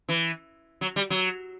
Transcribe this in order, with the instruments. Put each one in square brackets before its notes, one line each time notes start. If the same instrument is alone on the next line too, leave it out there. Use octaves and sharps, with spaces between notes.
[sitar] E3
F#3
G3
F#3